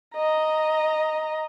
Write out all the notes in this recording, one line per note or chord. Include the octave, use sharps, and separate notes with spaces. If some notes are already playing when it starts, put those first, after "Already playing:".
D#5 A#5